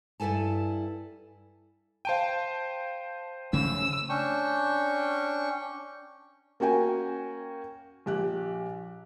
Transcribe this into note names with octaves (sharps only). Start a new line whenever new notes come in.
G2 E4 A4 G#5 A5
C5 F5 G5 A5 D#7
C#3 A3 C#4 E6
C#4 D4 G5 C#6
A#3 C#4 F#4 G5 G#5
A#1 G4 F#6